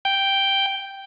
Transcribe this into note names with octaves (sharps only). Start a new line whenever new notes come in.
G5